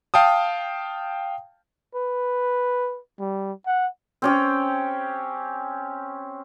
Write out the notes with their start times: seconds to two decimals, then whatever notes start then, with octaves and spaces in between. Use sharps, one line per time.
0.14 F5 G5 A5 D#6
1.95 B4
3.20 G3
3.67 F#5
4.22 C4 C#4 G4